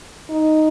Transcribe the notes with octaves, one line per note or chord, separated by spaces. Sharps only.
D#4